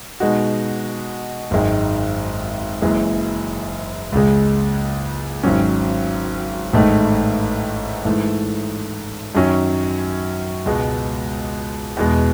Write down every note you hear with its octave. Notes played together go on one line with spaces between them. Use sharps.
B2 G#3 D#4 F#4
G#1 F#2 D#3 G#3
F#1 F#2 E3 G#3
C#2 C#3 G#3
G#1 G#2 D#3 F#3 C#4
A1 G#2 D#3 A3 D#4
G#2 E3 A3
F#2 D#3 F#3 C#4
C#2 B2 G#3
E2 B2 G#3